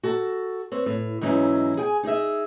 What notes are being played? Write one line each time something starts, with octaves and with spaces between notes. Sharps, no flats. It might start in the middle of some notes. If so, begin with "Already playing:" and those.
F#4 A4 A5
C4 B4 C#5
A2
G#2 E3 F#3 C#4 D#4 E4
G#4 G5 G#5
D#4 G#4 D#5 E5